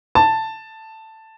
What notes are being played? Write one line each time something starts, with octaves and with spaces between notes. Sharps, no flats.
A5